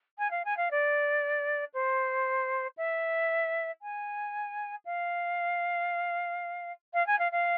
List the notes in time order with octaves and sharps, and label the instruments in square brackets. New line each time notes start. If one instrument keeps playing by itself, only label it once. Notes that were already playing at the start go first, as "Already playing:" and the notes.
[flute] G#5
F5
G#5
F5
D5
C5
E5
G#5
F5
F5
G#5
F5
F5